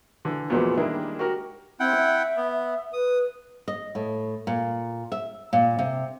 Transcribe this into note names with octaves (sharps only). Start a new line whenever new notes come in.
D3 E3
E2 A#2 F3 F#3 G#3 B3
D#3 G3 G#3 A#3 D4 E4
F#4 G4 A#4
C4 E4 F#5 G5
E5
B3
B4 D#6
D#5
A2
A#2
E5
A#2
C3